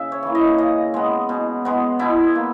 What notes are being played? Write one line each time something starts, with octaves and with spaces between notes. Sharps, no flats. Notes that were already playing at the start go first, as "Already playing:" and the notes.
Already playing: C#3 E5
C#5
E3 A#3
D#5
C#3 D#5
G#3 B3
B2
G#3 B3
B2 E4
A#3